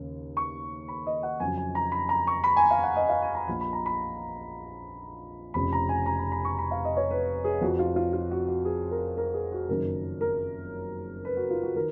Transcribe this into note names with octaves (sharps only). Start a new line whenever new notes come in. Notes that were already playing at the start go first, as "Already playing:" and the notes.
Already playing: D#2 C#3
C#6
B5
D#5
F#5
F2 C#3 F#3 G#5
G#5
A#5
B5
A#5
C#6
B5
G#5
F5
F#5
D#5
F5
G#5
A#5
A#1 A#2 F3 B5
B5
A#5
B5
F1 F2 C#3 B5
A#5
G#5
A#5
B5
B5
C#6
B5
F5
D#5
C#5
B4
G#4
F2 F3 F#4
F4
F4
F4
F#4
F#4
G#4
A#4
A#4
G#4
F#4
F#1 F#2 D#3 F#3 A#4
A#4
B4
F#4
F4
F#4
D#3 A#4